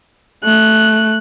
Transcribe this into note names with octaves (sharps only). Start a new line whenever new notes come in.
A3 F#6